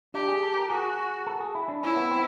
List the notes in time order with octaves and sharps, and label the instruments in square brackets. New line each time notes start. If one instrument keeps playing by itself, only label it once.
[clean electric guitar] D4 [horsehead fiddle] G4
[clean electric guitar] G#4
A4
A#4
[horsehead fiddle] F#4 [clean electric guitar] G#4
[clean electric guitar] A4
G#4
E4
D4
[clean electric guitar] C#4 [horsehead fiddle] E4
[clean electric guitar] B3
C4